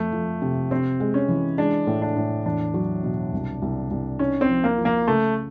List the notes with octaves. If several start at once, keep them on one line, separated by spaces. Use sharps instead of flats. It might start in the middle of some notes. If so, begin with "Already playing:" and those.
Already playing: F2 A3
F3
C3
C3 C4
G#3
C#4
E3
G#3 D4
A2
D4
A2
E2 D4
F#3
B2
C2
C2
C2
C#4 D#4
C4
F3
A#3
F3
A#3
C#3 A3